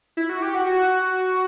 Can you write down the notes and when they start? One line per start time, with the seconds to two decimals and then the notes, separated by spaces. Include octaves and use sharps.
0.17 E4
0.29 F#4
0.42 G4
0.55 F#4
0.67 F#4